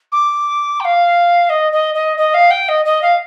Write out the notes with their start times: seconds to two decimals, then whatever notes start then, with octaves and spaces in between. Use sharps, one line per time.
0.12 D6
0.80 G5
0.84 F5
1.49 D#5
1.72 D#5
1.94 D#5
2.17 D#5
2.34 F5
2.50 G5
2.68 D#5
2.85 D#5
3.02 F5